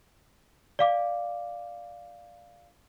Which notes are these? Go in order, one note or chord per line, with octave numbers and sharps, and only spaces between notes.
D5 F5 D6